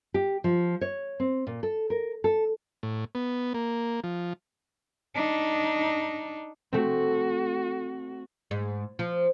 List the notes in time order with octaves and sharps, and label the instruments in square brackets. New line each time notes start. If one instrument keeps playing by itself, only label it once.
[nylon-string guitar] G4
F3
C#5
C4
A#2
A4
A#4
A4
[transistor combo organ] A2
B3
A#3
F3
[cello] D4 D#4
[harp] A3 C4 [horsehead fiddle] F#4
[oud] G#2
F3